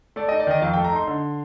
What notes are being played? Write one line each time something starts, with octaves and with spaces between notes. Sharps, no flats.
A3 D5
D#4 D#5
D5
D#3 D#5
F2 F5
A3 G5
A#5
D#4 C6
D3